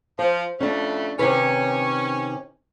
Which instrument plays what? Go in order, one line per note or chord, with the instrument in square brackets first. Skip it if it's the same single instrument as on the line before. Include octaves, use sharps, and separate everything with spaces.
[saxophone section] F3 [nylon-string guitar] C5
[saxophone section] F2 A2 A3 [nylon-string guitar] C#4 D4
[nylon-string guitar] C3 D#3 B4 [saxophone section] C#4